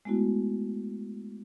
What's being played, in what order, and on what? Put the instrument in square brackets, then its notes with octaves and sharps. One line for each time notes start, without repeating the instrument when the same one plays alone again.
[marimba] G#3 A3 B3 E4 F#4